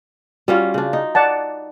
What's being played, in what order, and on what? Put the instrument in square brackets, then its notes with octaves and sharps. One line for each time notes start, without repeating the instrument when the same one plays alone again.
[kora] G3 C#4 F4 [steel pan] F#4
[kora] C#3 D4
D#4
[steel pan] D5 F#5 A5